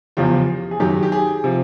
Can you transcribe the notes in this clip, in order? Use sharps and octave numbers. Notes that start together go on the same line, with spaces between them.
E2 C#3 F3 G4
G#4
F#2 D#3 F#3 G4
G4
G#4
C3 F3